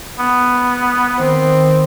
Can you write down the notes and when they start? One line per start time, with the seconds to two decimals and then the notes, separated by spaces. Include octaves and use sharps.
0.19 B3
1.19 D#3 C4